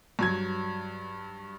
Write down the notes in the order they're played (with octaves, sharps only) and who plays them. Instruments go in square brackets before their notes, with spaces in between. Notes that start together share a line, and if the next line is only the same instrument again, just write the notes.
[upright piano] G2 F#3 G#6